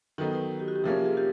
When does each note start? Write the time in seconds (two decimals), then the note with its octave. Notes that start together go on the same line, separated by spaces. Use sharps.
0.18 D#3 F#3 B3 D#4 A4
0.35 B4
0.59 G4
0.68 F#4
0.76 G4
0.84 C3 F3 A#3 C#4 G#4
1.05 G#4
1.17 G4